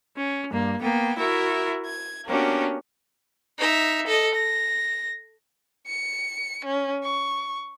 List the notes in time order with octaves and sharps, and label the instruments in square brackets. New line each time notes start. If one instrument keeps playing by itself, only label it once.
[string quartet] C#4
G2 A#3
A#3 B3 G5
E4 F#4 A#4 E5
G#6
A#3 B3 C#4 D4 F#4 G4
[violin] D#4 E5
A4 D#5
A#6
C#7
C#4
C#6